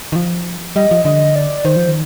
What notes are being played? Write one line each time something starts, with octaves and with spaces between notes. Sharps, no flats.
D#3
F3
G3 D#5
F3
D3 D#5
D5
D#3 C5
F3
D#3